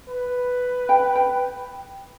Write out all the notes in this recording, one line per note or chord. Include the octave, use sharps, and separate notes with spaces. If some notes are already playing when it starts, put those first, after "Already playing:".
B4
G5
G5